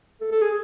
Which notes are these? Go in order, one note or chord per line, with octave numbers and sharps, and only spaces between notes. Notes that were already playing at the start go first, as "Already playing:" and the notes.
A4
A4
G#4